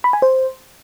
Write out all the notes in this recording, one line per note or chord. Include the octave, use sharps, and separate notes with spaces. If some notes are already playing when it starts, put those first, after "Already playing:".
B5
G#5
C5